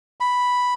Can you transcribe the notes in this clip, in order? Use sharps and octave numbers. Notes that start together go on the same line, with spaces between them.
B5